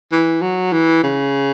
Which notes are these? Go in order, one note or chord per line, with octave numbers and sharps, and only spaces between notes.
E3
F#3
E3
C#3